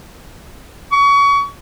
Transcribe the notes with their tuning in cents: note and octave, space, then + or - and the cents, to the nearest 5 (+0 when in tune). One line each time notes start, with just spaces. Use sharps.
C#6 +30